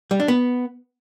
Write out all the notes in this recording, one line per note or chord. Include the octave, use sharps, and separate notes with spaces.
G3
D4
B3